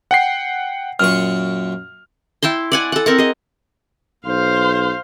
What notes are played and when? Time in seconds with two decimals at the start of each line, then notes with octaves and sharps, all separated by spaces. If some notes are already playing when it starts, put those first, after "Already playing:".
0.11 F#5 G5 C7
0.99 F#2 A#2 C#6 F6
2.43 E4 G5 A5 C6
2.72 D5 F#5 G#5
2.92 A4 F#5
3.06 C4 A#4 F#5
3.18 G#4 D#5
4.26 B1 C5 F5